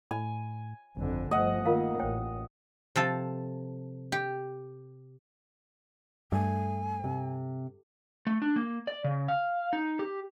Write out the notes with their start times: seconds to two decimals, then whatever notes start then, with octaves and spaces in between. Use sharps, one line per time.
0.11 A2 G#5 B5
0.97 G1 F2 D3
1.31 G1 F3 A3 D#5 F#5
1.66 D#3 A#3 F4 A#4 F5
1.99 A1 C5 C#5 G5
2.96 C3 F3 A4
4.12 G4
6.32 G2 A3 G#5
7.04 C3
8.27 A3
8.42 D4
8.56 A#3
8.87 D5
9.04 C#3
9.28 F5
9.73 D#4
9.99 G4